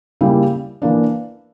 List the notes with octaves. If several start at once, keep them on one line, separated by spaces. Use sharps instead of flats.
C#3 G3 A#3 E4 G4
E3 A#3 D4